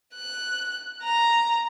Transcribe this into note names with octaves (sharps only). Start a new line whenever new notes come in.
F#6
A#5